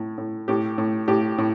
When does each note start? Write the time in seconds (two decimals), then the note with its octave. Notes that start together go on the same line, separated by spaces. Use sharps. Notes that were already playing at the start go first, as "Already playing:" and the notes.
Already playing: A2
0.18 A2
0.48 A2 G4
0.78 A2
1.08 A2 G4
1.38 A2